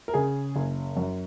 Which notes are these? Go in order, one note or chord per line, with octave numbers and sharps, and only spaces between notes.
A#4
C#3 G#4
F#1
F#2